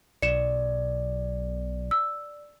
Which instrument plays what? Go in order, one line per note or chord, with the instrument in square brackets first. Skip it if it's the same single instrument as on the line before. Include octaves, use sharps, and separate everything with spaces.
[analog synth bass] B1 [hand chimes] D5 [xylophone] C#7 E7
[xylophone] E6